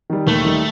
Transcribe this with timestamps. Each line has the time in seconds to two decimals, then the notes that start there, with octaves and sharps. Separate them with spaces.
0.10 D#3 G3
0.27 D#2 A3
0.45 D#3 G3